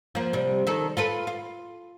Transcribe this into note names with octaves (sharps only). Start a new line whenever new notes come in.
F3 A#3
C3 G3
D#3 A4
F4 A4 B4
F4